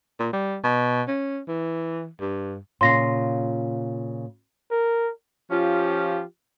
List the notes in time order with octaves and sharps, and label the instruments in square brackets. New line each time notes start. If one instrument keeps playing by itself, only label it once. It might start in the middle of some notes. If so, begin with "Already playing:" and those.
[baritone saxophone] A#2
G3
B2
C#4
E3
G2
[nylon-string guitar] A#2 C#3 F4 [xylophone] C6 A#6 C7
[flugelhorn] A#4
[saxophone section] F3 C#4 F4 G4